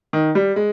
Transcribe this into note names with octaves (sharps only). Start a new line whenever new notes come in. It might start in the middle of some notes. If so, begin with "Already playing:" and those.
D#3
G3
G#3